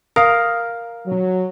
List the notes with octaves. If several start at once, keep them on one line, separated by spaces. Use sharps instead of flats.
A#4 F5 A#5 D#6
F#3